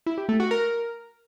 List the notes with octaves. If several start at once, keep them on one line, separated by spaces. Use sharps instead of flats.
E4
G4
A3
F#4
A#4